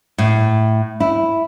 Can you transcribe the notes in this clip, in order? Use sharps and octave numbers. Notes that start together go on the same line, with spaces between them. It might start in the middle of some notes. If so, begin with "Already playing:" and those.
A2
E4